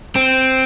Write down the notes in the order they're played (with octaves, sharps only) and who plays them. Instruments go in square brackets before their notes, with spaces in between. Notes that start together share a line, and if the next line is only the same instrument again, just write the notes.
[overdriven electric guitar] C4